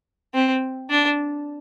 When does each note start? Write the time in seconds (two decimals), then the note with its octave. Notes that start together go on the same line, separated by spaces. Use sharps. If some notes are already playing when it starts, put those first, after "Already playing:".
0.34 C4
0.90 D4